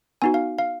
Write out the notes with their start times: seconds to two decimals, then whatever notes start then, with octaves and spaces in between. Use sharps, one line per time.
0.22 B3 D#4 F#4 G#5
0.34 F5
0.58 F5